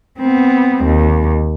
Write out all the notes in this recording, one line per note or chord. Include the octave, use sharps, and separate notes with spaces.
B3 C4
D#2